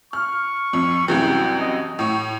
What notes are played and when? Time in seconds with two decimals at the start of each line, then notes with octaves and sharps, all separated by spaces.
0.13 C#6 F6
0.73 F2
1.08 C2 F#2 E3 G5
1.60 D#5
1.99 A2 C#6